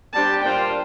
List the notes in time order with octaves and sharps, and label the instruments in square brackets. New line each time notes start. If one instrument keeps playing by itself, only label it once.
[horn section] G3 D4 G4 C5 [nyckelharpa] A5
[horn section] A#2 G3 D4 F4 C5 [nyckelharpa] G5